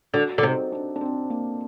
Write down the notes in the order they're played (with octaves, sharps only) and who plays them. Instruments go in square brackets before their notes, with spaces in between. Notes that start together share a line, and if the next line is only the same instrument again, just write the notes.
[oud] D3 [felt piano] F#4
[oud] D3
[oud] C3 [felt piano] D#4
[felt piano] D4
D4
C4
A#3